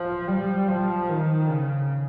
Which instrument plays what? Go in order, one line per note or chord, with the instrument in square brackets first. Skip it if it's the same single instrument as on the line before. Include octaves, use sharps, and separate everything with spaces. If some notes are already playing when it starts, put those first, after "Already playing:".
Already playing: [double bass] F3
G3
F3
D#3
C#3